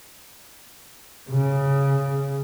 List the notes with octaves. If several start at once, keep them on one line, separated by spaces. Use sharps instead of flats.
C#3